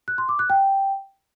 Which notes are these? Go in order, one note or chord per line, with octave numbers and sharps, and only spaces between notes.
F#6
C6
D6
F#6
G5